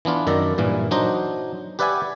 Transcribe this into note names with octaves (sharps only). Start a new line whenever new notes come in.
E3 B3 D4 F4
F#2 D#3 D5 E5 A#5
G2 A#2 E3
F#3 D4 D#4 C5 A#5
G4 B4 D5 E5 F#5 G#5